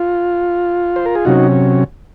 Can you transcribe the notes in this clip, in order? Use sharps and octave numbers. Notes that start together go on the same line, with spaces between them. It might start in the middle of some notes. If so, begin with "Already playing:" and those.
Already playing: F4
C5
A#4
G#4
C3 F#3 C#4 D#4 F#4